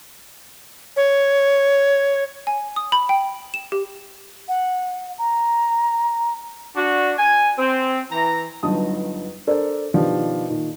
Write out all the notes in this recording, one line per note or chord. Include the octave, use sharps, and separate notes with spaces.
C#5
G#5
D#6
B5
G5
E7
G4
F#5
A#5
D4 F#4
G#5
C4
E3 A#5
G1 G2 F#3 D#4 A5 D#6
D4 A4 A#4 C5 D5
B2 D#3 F3 D4 G4
A#2 D#3